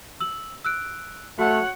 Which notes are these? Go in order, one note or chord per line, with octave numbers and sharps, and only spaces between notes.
E6 F#7
E6 F#6 D7
A3 F#4 C#5 F#5